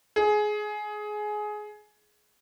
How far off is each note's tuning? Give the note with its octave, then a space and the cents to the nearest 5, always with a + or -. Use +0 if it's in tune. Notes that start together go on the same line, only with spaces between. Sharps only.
G#4 +15